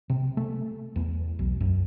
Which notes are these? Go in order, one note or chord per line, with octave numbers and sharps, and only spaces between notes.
C3
A3
E2
B1
F#2